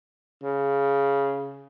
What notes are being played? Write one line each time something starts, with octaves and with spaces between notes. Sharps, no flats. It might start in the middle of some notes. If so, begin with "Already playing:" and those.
C#3